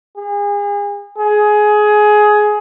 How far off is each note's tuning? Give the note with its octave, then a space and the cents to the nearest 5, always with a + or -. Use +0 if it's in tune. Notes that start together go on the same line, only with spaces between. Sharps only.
G#4 -35
G#4 +15